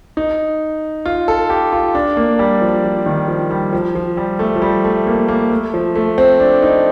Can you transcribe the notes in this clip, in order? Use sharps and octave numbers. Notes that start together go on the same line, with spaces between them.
D#4
F4
A4
G4
F4
D4
A#3
G3
F3
F3
D#3
F3
G3
F3
F3
G3
A3
F3
G3
A3
A#3
A#3
A3
F3
A3
C4
D4
D#4